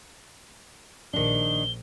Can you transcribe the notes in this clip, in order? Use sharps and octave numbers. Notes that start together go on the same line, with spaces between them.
A#1 D#3 D4 G7